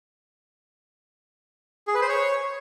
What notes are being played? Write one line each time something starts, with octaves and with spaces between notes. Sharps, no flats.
G#4
B4
C5
C#5